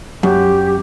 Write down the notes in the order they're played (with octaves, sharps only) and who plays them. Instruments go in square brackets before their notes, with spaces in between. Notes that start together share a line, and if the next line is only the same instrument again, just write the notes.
[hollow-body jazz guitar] F#2 [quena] G4